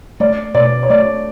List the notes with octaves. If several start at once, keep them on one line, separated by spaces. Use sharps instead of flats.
A3 D5
B2 D5
C#5
A3 D5